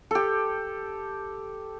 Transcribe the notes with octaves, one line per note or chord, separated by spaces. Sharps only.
G4 A4